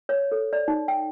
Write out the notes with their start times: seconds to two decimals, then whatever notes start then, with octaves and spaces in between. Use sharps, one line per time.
0.09 C#5
0.32 A4
0.53 D5
0.68 D#4
0.88 G5